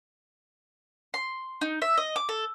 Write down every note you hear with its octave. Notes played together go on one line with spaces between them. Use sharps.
C6
D#4
E5
D#5
D6
A4